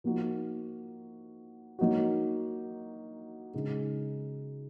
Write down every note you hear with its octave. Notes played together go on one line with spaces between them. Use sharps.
F3 A#3 D#4 F#4
F#3 A#3 D#4 F#4
C#3 G#3 D#4